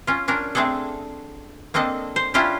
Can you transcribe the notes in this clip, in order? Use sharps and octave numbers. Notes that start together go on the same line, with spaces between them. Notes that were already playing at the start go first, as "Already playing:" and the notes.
C#4 F4
C#4 D4 F4 A#4
A3 C4 D4 G#4 A4
A#3 C4 D4 A4 D#5
C5
C#4 D4 E4 F4 G4 C5